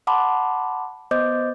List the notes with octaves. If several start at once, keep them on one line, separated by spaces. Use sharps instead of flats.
F#5 A5 B5 C6 D6
B3 C5 D#5 D6 G6